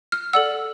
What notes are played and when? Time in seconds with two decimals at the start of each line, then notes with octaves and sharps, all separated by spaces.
0.12 F6
0.33 A4 D5 F#5 E6